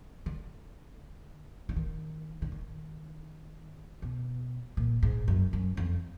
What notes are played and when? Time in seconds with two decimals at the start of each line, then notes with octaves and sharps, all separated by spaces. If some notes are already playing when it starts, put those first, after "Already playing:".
0.26 D3
1.69 D3
1.76 D#3
2.42 D3
2.52 D#3
4.02 B2
4.77 A#2
5.03 G#2
5.28 F#2
5.53 F#2
5.77 F2